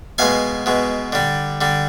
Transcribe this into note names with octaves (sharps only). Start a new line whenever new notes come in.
B2 G#3 F5 G#5
B2 G#3
D3 G3
D3 G3